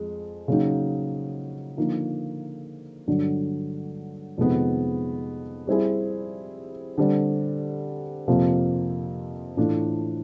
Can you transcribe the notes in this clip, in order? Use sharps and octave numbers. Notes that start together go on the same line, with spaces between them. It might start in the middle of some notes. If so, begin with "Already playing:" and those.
Already playing: F2 G#3
C#3 F#3 A#3 D#4
D3 F3 A#3 D#4
G2 D3 F#3
F2 C3 D#3 G#3 B3
G3 C4 E4 G#4
D3 G3 C4
F2 C3 F3 A#3
A2 E3 A3 D4 F4